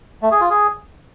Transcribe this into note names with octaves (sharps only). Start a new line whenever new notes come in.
A3
G#4
F4
G#4